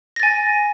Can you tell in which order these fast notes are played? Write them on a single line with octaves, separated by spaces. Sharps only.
A#6 A6 G#5